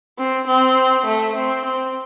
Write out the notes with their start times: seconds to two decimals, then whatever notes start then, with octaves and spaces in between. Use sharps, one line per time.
0.19 C4
0.47 C4
1.06 A3
1.35 C4
1.65 C4